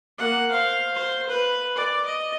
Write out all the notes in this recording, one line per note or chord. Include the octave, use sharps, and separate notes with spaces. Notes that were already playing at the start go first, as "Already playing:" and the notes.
A#3 F#5
C5 F5
C5
B4
D5
D#5